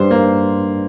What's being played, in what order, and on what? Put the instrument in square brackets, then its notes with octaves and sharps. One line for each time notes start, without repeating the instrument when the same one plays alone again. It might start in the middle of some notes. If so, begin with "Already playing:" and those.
Already playing: [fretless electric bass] G2 [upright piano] C5
[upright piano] A#3